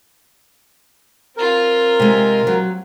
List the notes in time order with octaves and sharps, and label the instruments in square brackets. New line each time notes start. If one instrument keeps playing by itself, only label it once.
[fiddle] C4 F4 [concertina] A#4
[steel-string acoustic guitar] C3 G#3
F#3